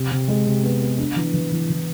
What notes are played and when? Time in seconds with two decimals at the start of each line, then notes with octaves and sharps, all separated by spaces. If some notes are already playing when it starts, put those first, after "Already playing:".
Already playing: C3
0.11 C3
0.28 G#3
0.46 C3
0.63 B3
0.82 B3
0.98 D4
1.16 E3
1.34 E3
1.52 E3
1.70 E3